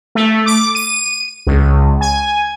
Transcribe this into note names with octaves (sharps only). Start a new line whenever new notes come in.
A3
D6
D#7
C#2
G#5